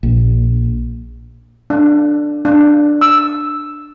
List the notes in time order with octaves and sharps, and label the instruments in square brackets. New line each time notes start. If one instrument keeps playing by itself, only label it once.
[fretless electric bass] A#1
[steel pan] D4
D4
E6